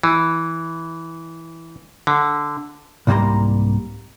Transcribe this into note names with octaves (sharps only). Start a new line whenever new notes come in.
E3
D3
C2 G#2 G3 A#3 A#5 C6